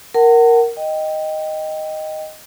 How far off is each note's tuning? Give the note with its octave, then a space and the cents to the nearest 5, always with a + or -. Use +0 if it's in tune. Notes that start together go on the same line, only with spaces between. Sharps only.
A#4 +0 F#5 +25 A5 +40
D#5 +0 G5 +0